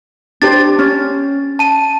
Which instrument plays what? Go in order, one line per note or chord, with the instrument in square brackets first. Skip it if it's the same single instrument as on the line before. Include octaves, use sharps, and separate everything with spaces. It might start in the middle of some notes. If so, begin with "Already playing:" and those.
[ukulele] D4 G4 C5 [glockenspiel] A6
[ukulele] C#4
[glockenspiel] A5 D#7